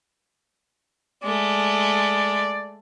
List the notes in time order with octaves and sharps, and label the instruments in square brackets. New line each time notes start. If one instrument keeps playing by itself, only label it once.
[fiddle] G#3 A3 [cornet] D5